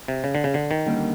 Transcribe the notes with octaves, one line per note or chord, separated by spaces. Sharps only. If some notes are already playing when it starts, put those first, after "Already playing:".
C3
C#3
D3
C#3
D3
D#3
D#2 D3 G3 A#3 C#4